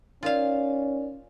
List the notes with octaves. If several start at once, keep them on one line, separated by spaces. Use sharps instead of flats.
C#4 D#4 F4 A#4 D5 F5